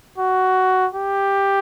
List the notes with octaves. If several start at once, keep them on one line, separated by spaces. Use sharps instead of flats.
F#4
G4